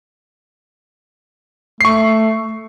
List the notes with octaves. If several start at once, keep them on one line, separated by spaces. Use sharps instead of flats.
A3 C#6 C7